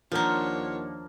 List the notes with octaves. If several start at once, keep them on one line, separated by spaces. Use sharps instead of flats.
D#2 F3 A#3 D4 F4 A#4 C#5 F#5